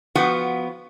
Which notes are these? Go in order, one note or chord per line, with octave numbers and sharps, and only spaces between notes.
F3 B3 F#4 F#5